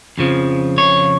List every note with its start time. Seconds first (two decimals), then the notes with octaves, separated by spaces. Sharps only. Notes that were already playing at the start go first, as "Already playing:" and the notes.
0.18 F2 C#3 F3
0.78 C#5